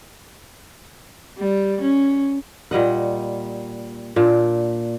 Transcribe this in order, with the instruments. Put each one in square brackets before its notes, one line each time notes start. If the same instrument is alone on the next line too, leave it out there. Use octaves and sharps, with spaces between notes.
[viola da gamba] G3
C#4
[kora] A#2 G3 D#5 F#5
A#2 D4